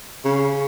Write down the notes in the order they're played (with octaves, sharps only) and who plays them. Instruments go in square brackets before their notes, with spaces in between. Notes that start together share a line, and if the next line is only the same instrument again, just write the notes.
[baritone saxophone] C#3